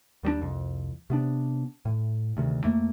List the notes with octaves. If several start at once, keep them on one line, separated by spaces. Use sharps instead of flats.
D#2 G3 A3 D4
C2 F2
C3 B3 D4
A2
D2 C3 D#3
F2 A3 A#3